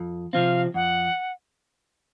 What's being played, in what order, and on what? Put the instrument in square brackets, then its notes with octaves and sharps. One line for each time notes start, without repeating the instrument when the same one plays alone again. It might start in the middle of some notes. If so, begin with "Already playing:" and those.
Already playing: [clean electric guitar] F2
[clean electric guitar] C3 F3 C4 [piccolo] F5
[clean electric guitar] F2 [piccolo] F#5